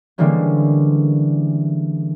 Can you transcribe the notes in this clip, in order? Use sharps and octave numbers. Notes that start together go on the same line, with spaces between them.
D3 E3 G3 G#3 A#3 C#4